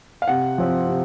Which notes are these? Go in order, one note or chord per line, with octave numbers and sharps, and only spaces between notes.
F5
C3 F#5
F3 C4
C3